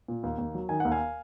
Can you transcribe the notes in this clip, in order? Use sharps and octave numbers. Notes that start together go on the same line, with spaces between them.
A#2
D#2
D#2
F#3
D#3 G#5
D#2 F#5
F5 G#5